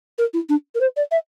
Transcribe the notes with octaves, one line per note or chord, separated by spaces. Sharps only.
A#4
E4
D4
A#4
C5
D5
E5